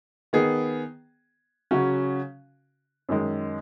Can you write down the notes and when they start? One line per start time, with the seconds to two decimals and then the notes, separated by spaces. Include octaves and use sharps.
0.33 D#3 B3 G#4
1.71 C#3 F#3 C#4 F#4
3.09 F#2 D#3 G#3